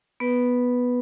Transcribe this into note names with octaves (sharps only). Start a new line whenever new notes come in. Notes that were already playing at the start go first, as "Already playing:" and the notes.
B3 B4